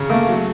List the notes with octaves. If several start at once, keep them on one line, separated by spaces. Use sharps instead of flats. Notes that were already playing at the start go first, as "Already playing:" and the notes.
Already playing: C#3
A3 A#3
F#3